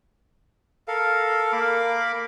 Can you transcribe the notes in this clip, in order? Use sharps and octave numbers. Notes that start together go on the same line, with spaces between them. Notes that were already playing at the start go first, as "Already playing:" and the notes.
A4 A#4 F5
A#3 A#4 B5 D6